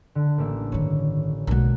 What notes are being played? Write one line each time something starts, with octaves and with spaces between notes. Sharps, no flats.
D3
A1 A#3 E5
G2 D#3 C#5
B1 G#3 A#3 F#4